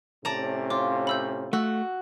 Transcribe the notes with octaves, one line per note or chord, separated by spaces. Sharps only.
A2 C3 C#4 D5 A5 A#5
F4 D6
B5 E6 G6
A3 F#4 E6